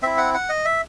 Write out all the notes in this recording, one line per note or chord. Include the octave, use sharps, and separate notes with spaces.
C4 E4 E5
F#5
F#5
D#5
E5